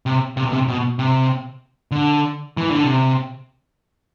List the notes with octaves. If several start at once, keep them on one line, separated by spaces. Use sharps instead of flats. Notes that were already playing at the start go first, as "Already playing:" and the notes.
C3
C3
B2
C3
B2
C3
D3
E3
D3
C3